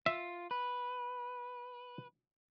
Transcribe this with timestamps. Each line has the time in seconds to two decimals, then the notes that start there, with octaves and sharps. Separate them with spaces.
0.06 F4 E5
0.51 B4